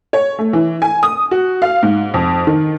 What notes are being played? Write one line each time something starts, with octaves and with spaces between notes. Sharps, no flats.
C#5
A3
E3
G#5
D#6
F#4
F5
G#2
F2
D#3